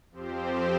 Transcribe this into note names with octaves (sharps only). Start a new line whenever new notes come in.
F2 F3 C4 G4 C5